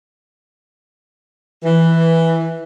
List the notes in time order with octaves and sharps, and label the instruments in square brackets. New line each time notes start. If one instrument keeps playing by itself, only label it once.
[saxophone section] E3